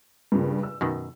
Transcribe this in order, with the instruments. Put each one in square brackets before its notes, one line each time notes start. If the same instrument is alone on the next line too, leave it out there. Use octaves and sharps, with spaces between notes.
[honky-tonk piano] G2 A#2 C#3
E6
[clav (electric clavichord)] F#2 B2 D#3